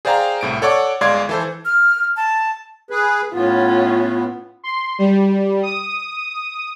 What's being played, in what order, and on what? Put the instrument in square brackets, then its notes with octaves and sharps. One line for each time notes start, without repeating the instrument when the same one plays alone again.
[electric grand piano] G#4 C5 D5 F5 G5 A#5
C2 A2 D7
A4 C#5 D5 F#5 C#6 D6
G1 G#3 D5 F5 C6 G#6
E3 A4 C5
[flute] F6
A5
[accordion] G#4 B4
[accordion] A2 B3 [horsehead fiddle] C#4 F4
[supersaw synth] C6
G3
D#6